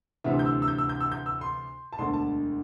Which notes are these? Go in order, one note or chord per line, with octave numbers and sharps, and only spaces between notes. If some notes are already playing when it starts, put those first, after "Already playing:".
D2 C3 E3 E5
G6
E6
E6
G6
E6
G6
E6
G6
E6
C6
A5
E1 D2 D3 C6
A5